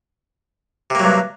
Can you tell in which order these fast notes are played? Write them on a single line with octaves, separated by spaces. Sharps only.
C3 A#3 F#3 G2